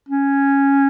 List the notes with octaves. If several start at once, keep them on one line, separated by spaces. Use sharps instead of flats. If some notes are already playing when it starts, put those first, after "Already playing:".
C#4